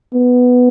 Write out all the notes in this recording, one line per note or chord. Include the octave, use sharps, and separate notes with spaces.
B3